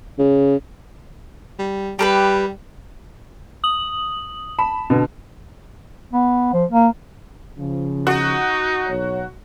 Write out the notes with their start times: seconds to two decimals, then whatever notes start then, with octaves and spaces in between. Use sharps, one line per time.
0.19 C#3
1.59 G3
1.99 G3 G4 A#4 B4
3.64 D#6 F#7
4.59 A5 B5
4.90 B2 D3
6.13 B3
6.53 F3
6.71 A#3
7.58 C#3 F3
8.07 D#4 F#4
8.87 B1 C#5 A#5